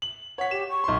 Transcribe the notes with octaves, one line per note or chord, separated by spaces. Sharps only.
F#7
C#5 F#5 B6
G4 E7
C#6
B1 C6